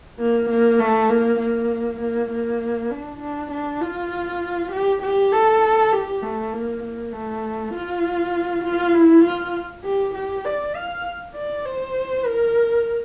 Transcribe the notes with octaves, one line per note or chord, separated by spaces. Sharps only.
A#3
A#3
A3
A#3
A#3
A#3
A#3
D4
D4
D4
F4
G4
G4
A4
G4
A3
A#3
A#3
A3
F4
F4
E4
F4
G4
G4
D5
F5
D5
C5
A#4